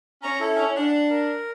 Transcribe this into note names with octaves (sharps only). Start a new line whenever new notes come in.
C#4 A#5
E4 A4
C#4
D4 F#5
A#4